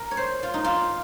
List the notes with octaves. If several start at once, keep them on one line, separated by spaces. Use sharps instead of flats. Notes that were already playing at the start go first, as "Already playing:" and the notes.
Already playing: A#4
C#5
C5
F4
D#4
F4